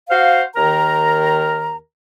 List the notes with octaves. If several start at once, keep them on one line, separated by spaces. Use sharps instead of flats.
F#4 C5 F5
D#2 D#3 A#4 A#5